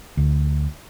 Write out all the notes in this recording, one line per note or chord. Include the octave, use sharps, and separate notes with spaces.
D2